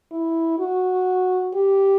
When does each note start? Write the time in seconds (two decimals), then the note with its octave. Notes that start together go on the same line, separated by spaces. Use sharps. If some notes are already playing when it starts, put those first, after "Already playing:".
0.11 E4
0.59 F#4
1.54 G4